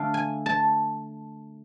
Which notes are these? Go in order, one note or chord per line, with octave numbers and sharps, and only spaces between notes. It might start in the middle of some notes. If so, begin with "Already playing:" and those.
Already playing: D3 A3 D4 F5
G#5
A5